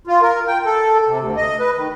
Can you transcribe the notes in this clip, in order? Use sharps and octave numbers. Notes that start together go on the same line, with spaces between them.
F4
A#4
G5
A4
C3
D2
D#5
B4
D#3